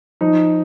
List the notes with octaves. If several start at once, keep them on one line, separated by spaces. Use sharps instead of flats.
F3 D#4